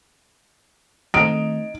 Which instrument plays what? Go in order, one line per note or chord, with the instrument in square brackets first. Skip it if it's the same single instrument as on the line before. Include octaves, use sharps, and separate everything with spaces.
[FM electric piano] D#3 A3 C4 [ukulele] D#4 [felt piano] D7